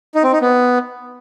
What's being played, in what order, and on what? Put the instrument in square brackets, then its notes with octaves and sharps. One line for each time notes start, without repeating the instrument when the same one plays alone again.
[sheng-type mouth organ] D#4
C4
D#4
B3